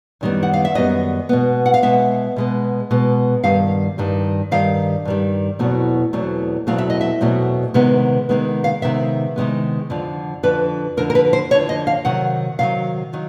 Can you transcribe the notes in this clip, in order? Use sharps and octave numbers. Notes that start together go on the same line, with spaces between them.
F#2 D#3 G3 B3
F#5
F5
E5
F#2 D#3 G3 B3 D#5
B2 G#3 B3
F#5
F5
B2 G#3 B3 E5
B2 G#3 B3
B2 G#3 B3
G2 D#3 G3 F5
G2 D#3 G3
G2 D#3 G3 F5
G2 D#3 G3
E2 B2 F#3 A3 C4
E2 B2 F#3 A3 C4
E2 B2 F#3 A3 C4 F5
E5
D#5
E5
E2 B2 F#3 A3 C4
C3 D#3 G#3 B3
C3 D#3 G#3 B3
F5
C3 D#3 G#3 B3 E5
C3 D#3 G#3 B3
F2 D3 F3
F2 D3 F3 B4
F2 D3 F3 A#4
A#4
B4
C5
F2 D3 F3 C#5
D#5
F5
C3 D#3 F#3 F#5
C3 D#3 F#3 F5
D#3 F#3